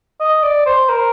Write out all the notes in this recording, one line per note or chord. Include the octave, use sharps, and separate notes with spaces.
D#5
D5
C5
A#4